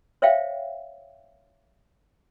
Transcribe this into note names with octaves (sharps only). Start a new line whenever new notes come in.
C5 C#5 E5 F5 G5